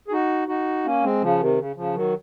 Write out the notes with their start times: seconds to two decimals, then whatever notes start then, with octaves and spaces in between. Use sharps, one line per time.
0.08 G#4
0.12 D#4 F#4
0.48 D#4 F#4
0.85 A#3 C#4
1.03 G#3 C4
1.22 C#3 F3
1.40 C3 D#3
1.59 C#3
1.76 C#3 F3
1.95 D#3 F#3